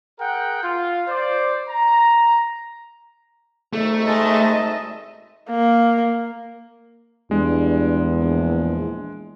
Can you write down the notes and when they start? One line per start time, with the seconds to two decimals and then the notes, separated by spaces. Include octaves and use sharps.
0.19 G#4 A#4 F#5 G5
0.63 F4
1.08 C5 D5
1.68 A#5
3.73 G#1 G3 A3 D#4
4.07 G#3 D#5 E5 A5
5.50 A#3
7.31 E2 G2 G#3
8.20 A#1